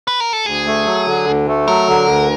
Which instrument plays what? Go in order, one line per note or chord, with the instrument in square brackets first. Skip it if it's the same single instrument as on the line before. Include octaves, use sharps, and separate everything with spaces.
[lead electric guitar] B4
A#4
A4
[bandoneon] D2 [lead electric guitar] G#4
[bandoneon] A3
F#3
D3
D2
A3
[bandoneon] F#3 [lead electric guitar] A#4
[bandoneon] D3
D2